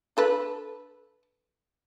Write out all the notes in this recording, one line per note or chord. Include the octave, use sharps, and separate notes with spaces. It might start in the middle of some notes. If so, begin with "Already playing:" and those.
D4 A4 B4